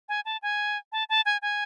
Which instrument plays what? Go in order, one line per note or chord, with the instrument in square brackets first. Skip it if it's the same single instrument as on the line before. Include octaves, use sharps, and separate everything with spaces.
[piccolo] G#5
A5
G#5
A5
A5
G#5
G#5